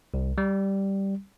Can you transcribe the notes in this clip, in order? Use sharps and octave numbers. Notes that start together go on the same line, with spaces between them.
C2
G3